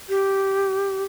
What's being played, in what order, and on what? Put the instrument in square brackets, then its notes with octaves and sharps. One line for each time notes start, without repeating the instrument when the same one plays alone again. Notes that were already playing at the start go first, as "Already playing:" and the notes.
[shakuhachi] G4